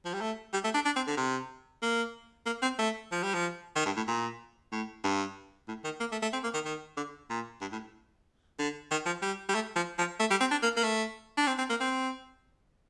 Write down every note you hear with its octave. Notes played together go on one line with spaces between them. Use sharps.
F3
G3
A3
G3
A3
D4
D4
C4
D3
C3
A#3
A#3
C4
A3
F3
G3
F3
D#3
G2
A2
A#2
A2
G2
A2
D#3
A#3
A3
A3
C4
A#3
D#3
D#3
D3
A#2
G2
A2
D3
D#3
F3
G3
G3
A3
F3
F3
A3
G3
C4
D4
A#3
A#3
A3
D4
C4
C4
A#3
C4